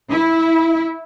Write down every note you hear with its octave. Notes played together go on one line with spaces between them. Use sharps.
E4